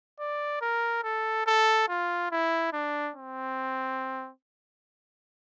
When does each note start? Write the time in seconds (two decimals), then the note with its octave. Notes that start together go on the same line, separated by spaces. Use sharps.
0.19 D5
0.61 A#4
1.03 A4
1.46 A4
1.88 F4
2.31 E4
2.73 D4
3.16 C4